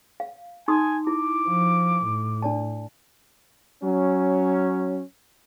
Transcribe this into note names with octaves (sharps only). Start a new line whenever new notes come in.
F5
D#4 G#5 C6 D#6
E4 D6
F3
A2
D4 D5 A5
F#3 C#4